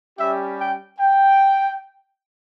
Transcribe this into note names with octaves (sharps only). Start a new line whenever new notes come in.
G3 C#4 G4 E5
G5
G5